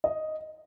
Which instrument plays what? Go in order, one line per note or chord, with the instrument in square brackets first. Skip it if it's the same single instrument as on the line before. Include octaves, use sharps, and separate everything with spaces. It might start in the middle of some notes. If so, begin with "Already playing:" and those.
[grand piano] D#5